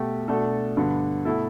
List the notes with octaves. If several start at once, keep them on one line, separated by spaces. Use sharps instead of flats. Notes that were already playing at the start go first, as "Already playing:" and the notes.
Already playing: B2 A3 G4
B2 A3 D4 A4
G2 D3 B3
B2 A3 E4 A4